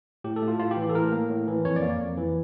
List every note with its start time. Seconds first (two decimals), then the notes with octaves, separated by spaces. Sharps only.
0.24 A2 G4
0.36 A4
0.42 A3
0.48 F4
0.59 A2 F4
0.71 G4
0.77 E3
0.89 A4
0.95 A2 A#4
1.12 A#3
1.29 A2
1.48 E3
1.65 F2 C#5
1.76 D5
1.82 A#3
2.00 F2
2.17 E3